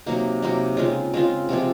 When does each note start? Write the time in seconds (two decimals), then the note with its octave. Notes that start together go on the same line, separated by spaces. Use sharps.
0.06 C3 F#3 A#3 D#4
0.42 C3 F#3 A#3 D#4
0.77 C#3 G#3 C4 F4
1.14 C#3 G#3 C4 F4
1.49 C3 F3 G#3 C4